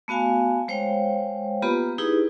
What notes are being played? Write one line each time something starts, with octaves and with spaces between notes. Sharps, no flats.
A3 B3 F#4 F5 G#5
G#3 C5 C#5 F5 G5
A#3 B3 F4 G4 B4 B5
D#4 E4 G4 G#4 B4